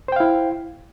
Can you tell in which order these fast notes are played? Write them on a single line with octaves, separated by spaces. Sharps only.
C5 G5 F5 E4